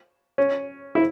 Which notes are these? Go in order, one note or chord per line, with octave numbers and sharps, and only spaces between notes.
C#4
E4